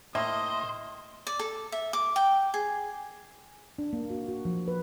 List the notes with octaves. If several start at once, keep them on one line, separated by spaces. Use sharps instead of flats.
A2 A#3 C5 D#5 E5
D5
A4
E5
D6
G5
G#4
D4
A#3
F#4
F#4
F3
B4